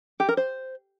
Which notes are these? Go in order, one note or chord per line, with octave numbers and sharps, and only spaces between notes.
G4
A#4
C5